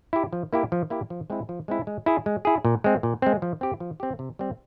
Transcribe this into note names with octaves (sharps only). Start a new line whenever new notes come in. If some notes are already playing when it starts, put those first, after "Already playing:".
E4 G4
F3
A#3 E4 G4
F3
A#3 E4 G4
F3
G#3 C4 E4
F3
G#3 C4 E4
G#3
E4 G#4
G#3
E4 G#4
A#2
G#3 C4
A#2
G#3 C4
F3
C4 G4
F3
C4 G4
C3
G3 C4